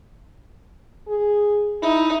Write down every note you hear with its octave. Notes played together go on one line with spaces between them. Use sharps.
G#4
D#4 E4